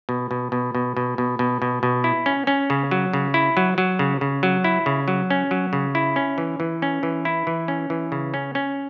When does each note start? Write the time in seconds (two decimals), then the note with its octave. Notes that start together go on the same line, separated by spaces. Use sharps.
0.09 B2
0.31 B2
0.52 B2
0.75 B2
0.97 B2
1.18 B2
1.39 B2
1.62 B2
1.83 B2
2.04 E4
2.26 C#4
2.47 C#4
2.70 C#3
2.91 F#3
3.13 C#3
3.34 E4
3.57 F#3
3.78 F#3
3.99 C#3
4.21 C#3
4.43 F#3
4.64 E4
4.86 C#3
5.08 F#3
5.30 C#4
5.51 F#3
5.73 C#3
5.95 E4
6.16 C#4
6.38 E3
6.60 E3
6.82 C#4
7.03 E3
7.25 E4
7.47 E3
7.68 C#4
7.90 E3
8.12 C#3
8.34 C#4
8.55 C#4